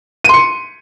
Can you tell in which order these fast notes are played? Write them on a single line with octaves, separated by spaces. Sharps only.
D#7 C6 C#7